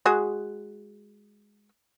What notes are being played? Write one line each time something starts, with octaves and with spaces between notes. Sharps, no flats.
G#3 F#4 G#4